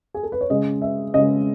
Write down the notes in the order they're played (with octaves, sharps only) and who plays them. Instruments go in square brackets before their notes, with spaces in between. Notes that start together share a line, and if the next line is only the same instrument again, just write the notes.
[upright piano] G#4
A4
B4
C#5
C#3 G#3 D#5
E5
C#3 G#3 D#5